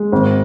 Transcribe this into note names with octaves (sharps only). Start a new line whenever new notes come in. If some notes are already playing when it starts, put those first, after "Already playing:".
Already playing: G#3
G#1